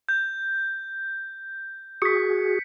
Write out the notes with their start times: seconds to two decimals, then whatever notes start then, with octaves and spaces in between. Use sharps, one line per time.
0.09 G6
2.02 F#4 G#4 B6 C#7